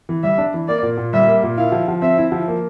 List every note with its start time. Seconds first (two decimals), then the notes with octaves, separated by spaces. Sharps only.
0.09 E3
0.23 G3 E5
0.38 D4
0.54 E3
0.68 A#3 D5
0.83 A#2
0.97 A#2
1.14 G3 E5
1.28 A#3
1.43 A#2
1.58 E4 F5
1.72 F3
1.88 F3
2.02 C4 E5
2.18 E4
2.32 F3
2.48 A#3